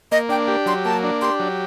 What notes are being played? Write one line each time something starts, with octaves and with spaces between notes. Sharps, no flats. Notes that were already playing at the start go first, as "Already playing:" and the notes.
A#3 D#5
D4 G5
G4
F#3 C6
A#3 A5
D4
G4 C6
F#3